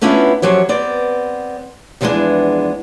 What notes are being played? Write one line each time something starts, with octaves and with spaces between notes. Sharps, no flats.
A3 B3 C#4 D4 E4 F4
F#2 F3 F#3 G4 C#5
B3 C4 D5
E2 F3 G3 G#3 B3 D4